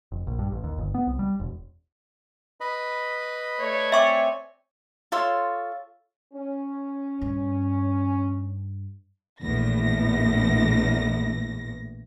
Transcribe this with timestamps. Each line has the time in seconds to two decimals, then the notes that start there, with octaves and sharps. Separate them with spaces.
0.12 F1
0.27 A#1
0.39 G2
0.52 A1
0.64 D#2
0.78 G1
0.94 B3
1.07 C2
1.19 G3
1.40 E1
2.61 B4 D#5 B5
3.60 A3 C#5 D5
3.92 C4 E5 G#5 C#6 D6
5.12 F4 A4 C#5 C6
6.34 C#4
7.21 G2
9.42 A#1 E2 A2 A#6